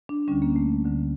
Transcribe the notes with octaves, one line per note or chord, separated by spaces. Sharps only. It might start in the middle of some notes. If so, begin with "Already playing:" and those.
D4
D2 D3 G3 C#4
A#3
A3
D2 D3 G3